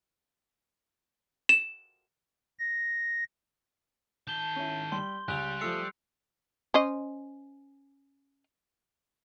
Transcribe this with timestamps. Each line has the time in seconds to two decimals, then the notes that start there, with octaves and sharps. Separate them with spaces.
1.49 E7
2.59 A#6
4.27 D#3 A5 G6 G7
4.56 C#4 E4
4.92 G3 C6
5.28 C#2 G3 F#6 F7
5.61 F3 A3 E6 C7 C#7
6.74 C#4 C5 D#5